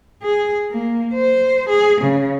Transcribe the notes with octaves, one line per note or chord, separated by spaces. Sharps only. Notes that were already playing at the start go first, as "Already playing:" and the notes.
G#4
A#3
C5
G#4
C#3